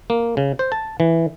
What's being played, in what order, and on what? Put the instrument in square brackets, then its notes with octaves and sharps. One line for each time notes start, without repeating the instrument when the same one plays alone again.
[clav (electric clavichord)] A#3
C#3
C5
A5
E3